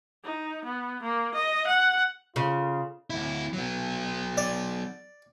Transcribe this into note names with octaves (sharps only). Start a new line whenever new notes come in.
D#4
B3
A#3
D#5
F#5
C#3 F4
D2 E4
F#3 B3
D5